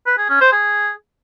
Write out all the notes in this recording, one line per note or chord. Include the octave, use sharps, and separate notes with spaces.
B4
G#4
C#4
C5
G#4